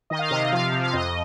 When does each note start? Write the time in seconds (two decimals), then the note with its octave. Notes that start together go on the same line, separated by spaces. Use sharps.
0.10 D#3 D#5
0.19 F5
0.28 C3 D#5
0.52 F3 F5
0.72 C3
0.83 F5
0.93 F2 D#5